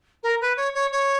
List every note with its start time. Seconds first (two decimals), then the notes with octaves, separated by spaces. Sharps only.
0.23 A#4
0.41 B4
0.57 C#5
0.74 C#5
0.92 C#5